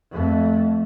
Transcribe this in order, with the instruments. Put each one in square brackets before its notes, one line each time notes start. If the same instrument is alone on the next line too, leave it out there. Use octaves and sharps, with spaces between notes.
[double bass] F2 A3